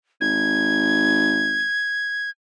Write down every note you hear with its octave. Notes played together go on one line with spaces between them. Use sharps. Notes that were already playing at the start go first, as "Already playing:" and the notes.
G#1 G#6